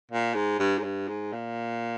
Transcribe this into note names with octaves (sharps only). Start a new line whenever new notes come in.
A#2
G#2
G2
G#2
G2
G#2
A#2